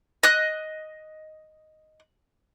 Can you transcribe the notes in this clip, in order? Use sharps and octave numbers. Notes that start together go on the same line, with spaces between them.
D#5 F#6